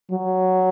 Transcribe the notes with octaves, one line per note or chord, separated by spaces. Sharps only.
F#3